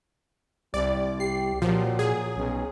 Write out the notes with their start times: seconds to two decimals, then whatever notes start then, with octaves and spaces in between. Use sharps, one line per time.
0.74 C2 G3 D5
1.20 G4 C7
1.62 A#2 F3 F#3
1.99 G#4
2.37 B1 C#4